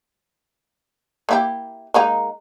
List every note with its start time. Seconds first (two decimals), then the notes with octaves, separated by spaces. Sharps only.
1.29 A#3 E4 G4
1.94 G#3 A#3 D#4